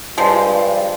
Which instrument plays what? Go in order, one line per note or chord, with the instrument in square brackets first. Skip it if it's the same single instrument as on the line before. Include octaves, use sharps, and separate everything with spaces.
[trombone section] G2 [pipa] C3 F3 G#3